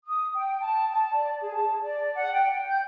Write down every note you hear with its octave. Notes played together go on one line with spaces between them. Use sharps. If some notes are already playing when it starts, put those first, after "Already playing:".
D#6
G5
A5
A5
D5
G#4
A5
D5
F#5
G5
G6